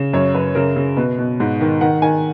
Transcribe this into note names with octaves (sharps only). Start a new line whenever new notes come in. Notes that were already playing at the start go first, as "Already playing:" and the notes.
Already playing: C#3
F#2 C#5
F#2 B4
C#3 A#4
C#3
B2 B4
B2
G#2
D#3
D#3 F#5
D#3 G#5